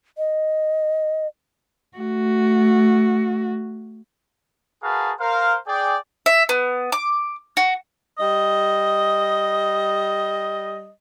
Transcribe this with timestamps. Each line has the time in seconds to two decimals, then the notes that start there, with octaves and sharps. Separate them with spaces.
0.18 D#5
1.97 A3 F#4
4.83 F#4 G#4 A#4 B4 F5 A5
5.20 A#4 C5 F5
5.67 G#4 D5 G5
6.26 E5
6.49 B3
6.92 D6
7.57 F#4
8.18 G3 D#5